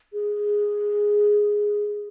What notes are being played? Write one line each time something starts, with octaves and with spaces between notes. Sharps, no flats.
G#4